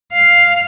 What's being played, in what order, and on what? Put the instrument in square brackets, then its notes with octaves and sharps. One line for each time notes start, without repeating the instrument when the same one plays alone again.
[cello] F5